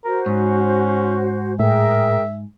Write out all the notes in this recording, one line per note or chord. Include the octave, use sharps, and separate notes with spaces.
F#4 A#4 C5
G#2 C#4
A2 G#4 A#4 E5 G5